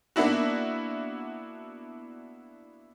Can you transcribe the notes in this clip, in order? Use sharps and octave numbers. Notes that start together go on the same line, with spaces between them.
A#3 B3 D4 E4 F#4